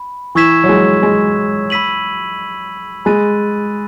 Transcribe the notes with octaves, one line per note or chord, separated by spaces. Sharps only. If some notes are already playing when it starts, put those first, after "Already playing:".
Already playing: B5
E3 C#6 E6 G#6 B6 E7
F#3
G#3
G#3
B5 E6 B6 D#7 F#7
G#3 B5 F#6 A6 D#7